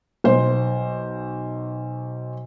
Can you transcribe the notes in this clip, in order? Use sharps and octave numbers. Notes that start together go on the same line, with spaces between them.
B1 C5